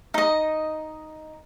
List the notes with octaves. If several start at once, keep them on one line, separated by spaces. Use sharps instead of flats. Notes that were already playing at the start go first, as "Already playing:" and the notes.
D#4 D#5